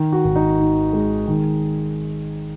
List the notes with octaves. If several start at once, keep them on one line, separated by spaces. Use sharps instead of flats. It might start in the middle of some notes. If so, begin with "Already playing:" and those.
Already playing: D#3
F#4
G#1
D#4
D#3
G#3
D#3